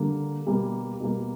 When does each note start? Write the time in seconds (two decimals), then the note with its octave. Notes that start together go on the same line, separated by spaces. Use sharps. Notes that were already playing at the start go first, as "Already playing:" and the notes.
Already playing: D3 G3 A#3
0.46 B2 G3 A#3
1.00 B2 G3 A#3